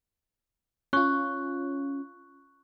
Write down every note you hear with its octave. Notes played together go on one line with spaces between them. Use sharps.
C#4 F4 C#6 F#6